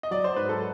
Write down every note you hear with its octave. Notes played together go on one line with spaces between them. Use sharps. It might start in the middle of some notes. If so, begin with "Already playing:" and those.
D#5
F#3 D5
C5
G#2 B4
A4